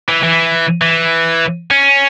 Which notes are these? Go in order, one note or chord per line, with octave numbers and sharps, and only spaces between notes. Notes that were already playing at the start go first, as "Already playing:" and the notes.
E3
E3
E3
C#4